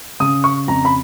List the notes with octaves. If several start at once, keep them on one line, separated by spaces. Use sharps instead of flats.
C#3 D#6
C#6
F2 A#5
B5